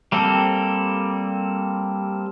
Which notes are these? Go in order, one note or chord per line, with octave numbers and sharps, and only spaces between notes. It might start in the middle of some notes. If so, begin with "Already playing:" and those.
G3 A#3 C4 A4